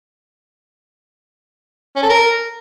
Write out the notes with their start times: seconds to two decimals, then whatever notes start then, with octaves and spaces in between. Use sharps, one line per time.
1.96 C#4
2.03 A4
2.10 A#4